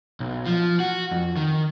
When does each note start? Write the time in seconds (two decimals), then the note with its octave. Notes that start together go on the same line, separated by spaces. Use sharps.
0.20 B1
0.46 F3
0.80 F#4
1.11 F2
1.37 D#3